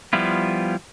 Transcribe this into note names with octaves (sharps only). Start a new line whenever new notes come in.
F3 G3 B3 E4 F4